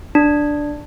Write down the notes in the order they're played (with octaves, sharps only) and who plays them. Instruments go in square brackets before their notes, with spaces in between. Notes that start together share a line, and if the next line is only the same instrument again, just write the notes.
[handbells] D4